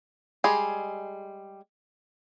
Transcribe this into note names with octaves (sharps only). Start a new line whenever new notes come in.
G3 G#3 G#4